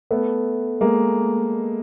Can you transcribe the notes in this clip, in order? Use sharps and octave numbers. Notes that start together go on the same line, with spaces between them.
A3 B3
G#3 A#3